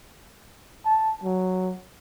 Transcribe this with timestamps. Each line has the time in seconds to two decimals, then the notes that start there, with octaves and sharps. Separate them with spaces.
0.86 A5
1.23 F#3